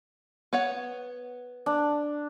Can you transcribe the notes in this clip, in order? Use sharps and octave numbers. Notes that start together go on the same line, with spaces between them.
B3 C#5 F#5
D4